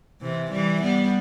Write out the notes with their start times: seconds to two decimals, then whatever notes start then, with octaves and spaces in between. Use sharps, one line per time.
0.21 C3 E3
0.51 E3 G3
0.82 G3 B3